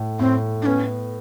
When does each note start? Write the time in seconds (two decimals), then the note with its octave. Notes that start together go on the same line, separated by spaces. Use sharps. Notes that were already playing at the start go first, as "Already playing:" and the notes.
Already playing: A2
0.19 A2 C4
0.62 D4
0.66 B3 C#4